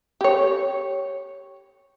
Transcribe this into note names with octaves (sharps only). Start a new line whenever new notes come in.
G4 C#5